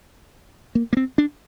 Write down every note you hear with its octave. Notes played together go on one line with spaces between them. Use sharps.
A#3
A#3
C4
D4